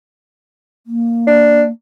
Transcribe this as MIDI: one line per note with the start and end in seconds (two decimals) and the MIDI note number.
0.87 1.71 58
1.27 1.63 62